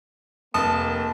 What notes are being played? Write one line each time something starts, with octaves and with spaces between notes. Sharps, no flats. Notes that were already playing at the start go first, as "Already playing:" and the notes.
F1 A#3 A5 D#6